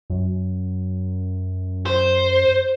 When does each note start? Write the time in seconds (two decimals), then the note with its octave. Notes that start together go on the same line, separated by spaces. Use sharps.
0.10 F#2
1.86 C5